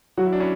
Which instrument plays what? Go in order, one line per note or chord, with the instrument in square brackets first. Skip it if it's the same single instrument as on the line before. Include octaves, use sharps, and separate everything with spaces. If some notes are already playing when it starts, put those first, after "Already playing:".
[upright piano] F#3 [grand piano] F#4
[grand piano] E4
D4
C#4 E4